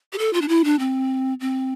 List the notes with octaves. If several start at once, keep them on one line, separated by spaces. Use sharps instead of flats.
G4
A4
F4
D4
E4
D4
C4
C4